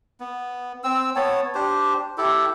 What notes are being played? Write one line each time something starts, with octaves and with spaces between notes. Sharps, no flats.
B3
C4 E6
B3 C#5 A5
D4 G4 C5
E4 G4 A4